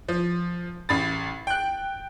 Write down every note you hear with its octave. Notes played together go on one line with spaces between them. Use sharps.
F3
A1 B5 A6
G5 F#6